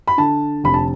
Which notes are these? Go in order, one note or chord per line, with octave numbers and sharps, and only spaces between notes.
B5
D3 A5
F1 B5
A5